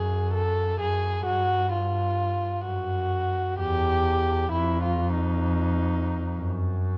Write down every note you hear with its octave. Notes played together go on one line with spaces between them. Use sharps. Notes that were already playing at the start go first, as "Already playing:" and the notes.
Already playing: F#2 G#4
A4
F#2 G#4
G2 F#4
F4
F#2 F#4
E2 G4
F2 E4
F4
D#4
F#2